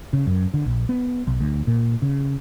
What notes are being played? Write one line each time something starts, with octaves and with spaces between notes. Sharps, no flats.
C#3
F#2
D3
A#1
B3
B1
D2
A#2
C#3